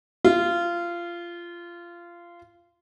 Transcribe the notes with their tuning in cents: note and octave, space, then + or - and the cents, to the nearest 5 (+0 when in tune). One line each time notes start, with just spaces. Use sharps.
F4 -20